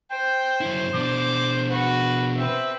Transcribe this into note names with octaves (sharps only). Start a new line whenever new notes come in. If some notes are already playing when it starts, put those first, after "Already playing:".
C5 G5
F#2 E4
B2 D4 D6
F#4 B4
C4 B4 E5